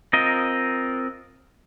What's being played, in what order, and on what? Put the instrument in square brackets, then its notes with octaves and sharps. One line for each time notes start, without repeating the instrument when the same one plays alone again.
[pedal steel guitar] C4 F4 A#4 D#5